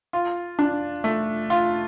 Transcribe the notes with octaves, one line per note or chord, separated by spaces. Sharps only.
F4
D4
A3
F4